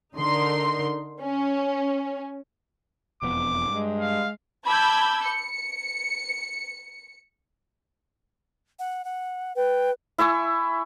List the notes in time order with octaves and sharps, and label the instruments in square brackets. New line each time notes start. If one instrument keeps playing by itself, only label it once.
[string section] D3 D#4 A#4 C6
C#4
[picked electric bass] E1 F2 B3 [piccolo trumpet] D6
[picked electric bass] G2 [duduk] G#3
[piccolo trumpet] F5
[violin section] A5 B5 D6 E6 G6 G#6
C#7
[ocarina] F#5
F#5
[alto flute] B4 [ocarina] G5
[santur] E4 E5 G#5 C#6